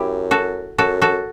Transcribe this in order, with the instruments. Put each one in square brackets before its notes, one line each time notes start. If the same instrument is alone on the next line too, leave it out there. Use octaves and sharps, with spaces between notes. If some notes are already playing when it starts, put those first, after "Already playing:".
Already playing: [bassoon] F#2 [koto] E4 G4
[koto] F#4 A4
[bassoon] F#2 [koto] F#4 A4
[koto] F#4 A4